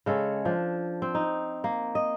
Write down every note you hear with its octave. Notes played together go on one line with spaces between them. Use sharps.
C#3 G#3 A4 C#5
F3 D4
C4
D#4
A#3
D#5